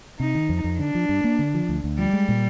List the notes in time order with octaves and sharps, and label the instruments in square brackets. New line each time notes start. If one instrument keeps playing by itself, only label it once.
[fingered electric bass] C3 [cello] D#4
[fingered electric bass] D#3
F2
F2
[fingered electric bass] D3 [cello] D4
[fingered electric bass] F3
G2
A#3
D3
F3
D2
D2
[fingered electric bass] F3 [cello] G3
[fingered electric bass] G#3
A#2